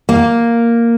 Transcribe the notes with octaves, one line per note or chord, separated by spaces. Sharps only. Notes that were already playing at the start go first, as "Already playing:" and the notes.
A#3